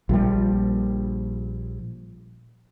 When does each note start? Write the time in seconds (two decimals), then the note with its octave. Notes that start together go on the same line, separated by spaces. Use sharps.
0.09 A#1 F3 G3